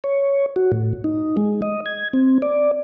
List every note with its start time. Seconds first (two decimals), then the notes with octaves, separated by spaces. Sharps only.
0.04 C#5
0.56 F#4
0.72 A2
1.04 D#4
1.37 G#3
1.62 D#5
1.86 G#6
2.13 C4
2.42 D5